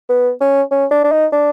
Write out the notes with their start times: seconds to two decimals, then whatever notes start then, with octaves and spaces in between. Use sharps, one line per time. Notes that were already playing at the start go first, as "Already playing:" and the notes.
0.09 B3
0.41 C#4
0.71 C#4
0.91 D4
1.04 D4
1.12 D#4
1.32 D4